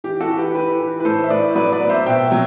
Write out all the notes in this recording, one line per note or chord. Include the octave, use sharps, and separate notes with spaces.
E3 G4
F#4 A4
E3
G4 B4
E3 G4 B4
E3
B4
A2 A4 C5
E5
A2 B4 D5
F#3 B4 D5
B4 D5
B3
C5 E5
B2 E5 G5
F#3